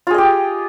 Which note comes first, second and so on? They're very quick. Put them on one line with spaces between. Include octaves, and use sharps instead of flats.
F4 G#4 D#5 G4